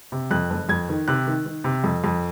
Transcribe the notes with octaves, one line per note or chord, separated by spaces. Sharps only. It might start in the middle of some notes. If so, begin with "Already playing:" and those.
C3
F2 F#6
F#1
F2 G#6
D#3
C3 F#6
D#3
D#3
C3
F2
F2